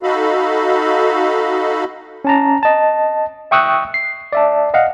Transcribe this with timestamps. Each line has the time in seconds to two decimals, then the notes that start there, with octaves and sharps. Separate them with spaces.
0.03 D#4 F#4 A4 D#5 F5 B5
2.25 C#4 A5 A#5
2.63 D#5 A5
3.51 E5 G5 C#6 D#6 E6 F#6
3.94 C7
4.33 D5 E5 A5
4.74 D#5 F5 F#5